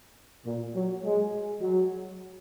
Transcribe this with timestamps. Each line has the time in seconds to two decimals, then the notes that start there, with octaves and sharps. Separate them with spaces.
0.46 A#2
0.75 F#3
1.03 G#3
1.60 F#3